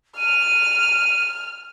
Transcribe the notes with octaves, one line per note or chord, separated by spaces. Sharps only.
F6 D#7